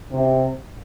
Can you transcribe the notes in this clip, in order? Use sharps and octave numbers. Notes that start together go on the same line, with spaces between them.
C3